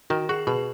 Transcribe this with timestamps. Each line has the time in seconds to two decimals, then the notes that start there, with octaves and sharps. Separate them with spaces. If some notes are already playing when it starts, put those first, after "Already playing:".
0.10 D#3 F#4
0.29 F#4 G#4
0.47 B2 G#4